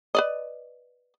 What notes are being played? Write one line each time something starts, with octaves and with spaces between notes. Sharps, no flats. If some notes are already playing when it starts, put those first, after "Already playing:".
B4 D5 D#5